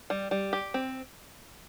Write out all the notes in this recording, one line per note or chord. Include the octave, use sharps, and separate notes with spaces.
G3
G3
G4
C4